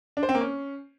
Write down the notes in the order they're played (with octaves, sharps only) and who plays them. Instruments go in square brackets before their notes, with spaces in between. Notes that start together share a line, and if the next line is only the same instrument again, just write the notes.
[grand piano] D4
C5
C4
A#3
C#4